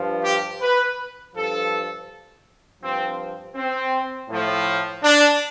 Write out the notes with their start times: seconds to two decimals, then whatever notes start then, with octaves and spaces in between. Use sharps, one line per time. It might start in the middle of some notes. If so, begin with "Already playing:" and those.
Already playing: G2 F3
0.24 G4
0.61 B4
1.35 G2 F3 A4
2.81 G2 F3 C4
3.55 C4
4.29 A2 F3
5.02 D4